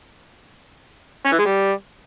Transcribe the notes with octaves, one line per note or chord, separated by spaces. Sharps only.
C#4
E3
G#3
G3